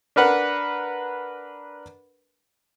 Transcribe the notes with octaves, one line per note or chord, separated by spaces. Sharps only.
D4 A#4 B4 F#5